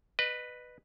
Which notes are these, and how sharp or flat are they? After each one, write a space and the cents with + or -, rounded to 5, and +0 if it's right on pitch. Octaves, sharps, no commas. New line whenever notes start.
B4 +0 D#5 -30